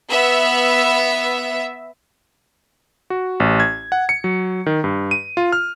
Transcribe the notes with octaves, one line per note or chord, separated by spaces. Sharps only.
B3 E5
F#4
A1
G#6
F#5
C#7
F#3
D#3
G2
D#7
F4
F6